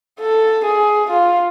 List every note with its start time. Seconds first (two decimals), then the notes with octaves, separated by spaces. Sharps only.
0.20 A4
0.65 G#4
1.10 F4